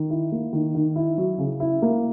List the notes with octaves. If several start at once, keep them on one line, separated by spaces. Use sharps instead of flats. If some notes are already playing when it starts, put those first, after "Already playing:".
Already playing: D#3
E4
A#3
D#3
D#3
E4
F#3
C#3
E4
A#3